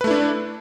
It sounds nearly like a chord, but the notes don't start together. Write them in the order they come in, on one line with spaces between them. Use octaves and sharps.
B4 A3 E4 D4